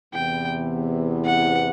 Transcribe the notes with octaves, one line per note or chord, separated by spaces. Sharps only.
E2 C3 E3 B3 G5
F#5